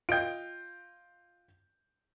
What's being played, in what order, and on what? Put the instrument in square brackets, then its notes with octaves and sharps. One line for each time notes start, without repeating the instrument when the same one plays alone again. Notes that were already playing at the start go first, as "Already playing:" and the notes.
[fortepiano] F4 D#5 G5 [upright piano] G6 D7